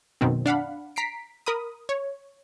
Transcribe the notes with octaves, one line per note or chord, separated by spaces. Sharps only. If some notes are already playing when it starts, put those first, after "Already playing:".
F#2 B2 D#3 C4
D4 F5 F#5 B5
A#5 B6 C7 D7
A#4 B5 D#6
C#5